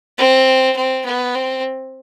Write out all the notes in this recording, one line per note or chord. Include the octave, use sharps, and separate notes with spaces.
C4
C4
B3
C4